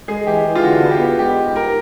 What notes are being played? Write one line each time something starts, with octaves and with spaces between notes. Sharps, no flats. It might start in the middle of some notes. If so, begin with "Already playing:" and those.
G#3 G#4
E3 G4
E3
F4
D3 F#4
B3
G4
B3
G#3 G4
G#2
G#2 A#4